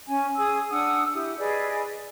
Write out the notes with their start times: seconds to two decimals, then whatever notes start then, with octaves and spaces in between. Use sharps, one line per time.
0.06 C#4 G#5
0.37 G#4 G#5 D#6 E6
0.70 D4 F#5 D#6 E6
1.13 E4 G4
1.38 G#4 B4 D5 D#5